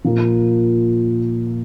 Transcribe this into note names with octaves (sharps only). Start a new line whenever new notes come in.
A#2 F3 A#3